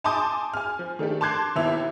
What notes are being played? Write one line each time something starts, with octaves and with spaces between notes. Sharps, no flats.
G#5 A5 C6 D6 D#6 G6
G#5 F6
F3
D#3 A3 D4 G4
A5 C6 D6 F#6 G#6 C7
D#2 B3 E4 E5 F7